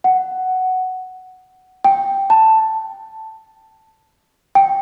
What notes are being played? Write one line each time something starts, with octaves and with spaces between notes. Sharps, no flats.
F#5
G5
A5
G5